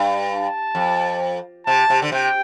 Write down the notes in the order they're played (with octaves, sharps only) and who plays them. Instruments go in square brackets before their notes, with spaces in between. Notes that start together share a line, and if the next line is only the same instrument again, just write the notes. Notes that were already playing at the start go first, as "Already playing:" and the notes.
Already playing: [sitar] G2
[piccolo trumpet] A5
[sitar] F2
[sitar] C3 [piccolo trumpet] A5
[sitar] C3
D3
[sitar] C3 [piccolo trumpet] G5